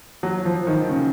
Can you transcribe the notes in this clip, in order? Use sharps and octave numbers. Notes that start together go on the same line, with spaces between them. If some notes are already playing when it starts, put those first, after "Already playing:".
F#3
F3
D#3
C#3